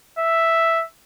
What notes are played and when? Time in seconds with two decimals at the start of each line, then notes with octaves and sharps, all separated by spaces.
0.18 E5